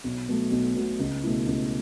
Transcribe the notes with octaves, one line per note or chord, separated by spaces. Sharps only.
B1
B2 F#3 A3
B1
B2 F#3 A3
C#2
B2 A3 E4
C#2